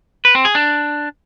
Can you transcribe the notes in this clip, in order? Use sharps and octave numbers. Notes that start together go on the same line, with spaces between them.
B4
C4
G#4
D4